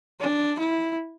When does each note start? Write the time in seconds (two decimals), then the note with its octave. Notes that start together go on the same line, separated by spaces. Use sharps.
0.20 D4
0.59 E4